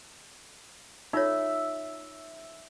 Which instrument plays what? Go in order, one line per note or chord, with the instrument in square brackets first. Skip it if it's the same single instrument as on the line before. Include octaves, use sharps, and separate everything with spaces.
[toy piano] D#4 F4 C#5 [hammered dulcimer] E5